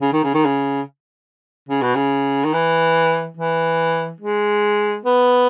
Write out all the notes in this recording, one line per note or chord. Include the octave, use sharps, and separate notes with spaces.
C#3
D#3
C#3
D#3
C#3
C#3
B2
C#3
D#3
E3
E3
G#3
B3